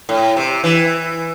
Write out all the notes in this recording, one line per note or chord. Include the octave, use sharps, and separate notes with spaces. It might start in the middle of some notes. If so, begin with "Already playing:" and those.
A2
C3
E3